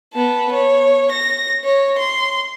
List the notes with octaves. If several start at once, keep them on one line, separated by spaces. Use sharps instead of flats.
B3 A5
C#5
A#6
C#5
C6